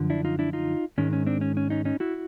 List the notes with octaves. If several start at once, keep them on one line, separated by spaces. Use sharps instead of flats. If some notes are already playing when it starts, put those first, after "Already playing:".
Already playing: F#2 D3 F3
D4 E4
D#4 F4
D4 E4
D#4 F4
G#2 D#3 G#3 C#4
C#4
C4 D4
C#4
C#4
C#4 D#4
C#4 D#4
E4 F#4